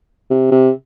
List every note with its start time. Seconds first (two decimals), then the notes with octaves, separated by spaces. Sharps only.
0.30 C3
0.51 C3